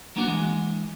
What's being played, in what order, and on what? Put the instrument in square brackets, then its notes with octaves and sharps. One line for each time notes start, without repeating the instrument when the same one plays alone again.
[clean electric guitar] F#3 A#3 B3 D4 F4 F#4
E3 G#3